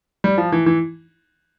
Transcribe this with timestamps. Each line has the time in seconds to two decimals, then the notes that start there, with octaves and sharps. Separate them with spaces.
0.24 G3
0.38 F3
0.52 E3
0.66 E3